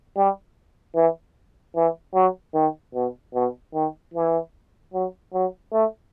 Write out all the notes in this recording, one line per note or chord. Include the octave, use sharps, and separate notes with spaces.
G3
E3
E3
F#3
D#3
B2
B2
D#3
E3
F#3
F#3
A3